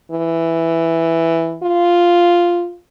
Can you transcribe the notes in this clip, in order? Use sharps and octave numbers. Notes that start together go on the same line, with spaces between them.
E3
F4